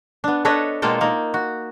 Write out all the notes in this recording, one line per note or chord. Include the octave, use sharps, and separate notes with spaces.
B3 D4
D4 A4 B4 C#5 D#5
B2 G#3 A#3 F4 A4 G5
A#3 D#4
F#4